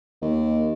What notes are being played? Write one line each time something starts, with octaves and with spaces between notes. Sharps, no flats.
D#2